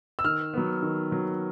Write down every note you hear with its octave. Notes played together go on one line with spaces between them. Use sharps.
E6
D#3 F6
F#3 B3
D#3
F#3 B3